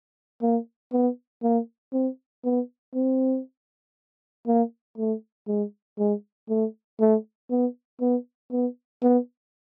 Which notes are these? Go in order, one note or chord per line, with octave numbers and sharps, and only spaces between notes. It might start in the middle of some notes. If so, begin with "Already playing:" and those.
A#3
B3
A#3
C4
B3
C4
A#3
A3
G#3
G#3
A3
A3
B3
B3
B3
B3